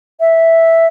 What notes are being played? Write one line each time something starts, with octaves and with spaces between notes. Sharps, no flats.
E5